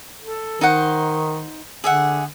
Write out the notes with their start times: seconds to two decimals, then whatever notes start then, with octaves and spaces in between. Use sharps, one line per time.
0.22 A4
0.61 D#3 D#4 C5 F#5
1.84 D3 G#4 E5 F#5